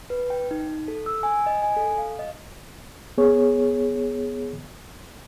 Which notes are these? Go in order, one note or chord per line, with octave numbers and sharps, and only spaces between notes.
B4
G5
D#4
A4
E6
G#5
D#5
G#5
A4
F5
D#5
B3 G#4 C#5